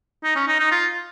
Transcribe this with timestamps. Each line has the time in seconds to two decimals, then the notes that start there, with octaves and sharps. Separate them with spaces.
0.24 D#4
0.36 C#4
0.48 D#4
0.60 D#4
0.71 F4